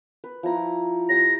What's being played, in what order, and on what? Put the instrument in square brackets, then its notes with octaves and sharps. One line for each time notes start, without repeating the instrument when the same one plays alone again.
[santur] B4
F3 E4 A#5
[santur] G4 C#5 [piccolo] A#6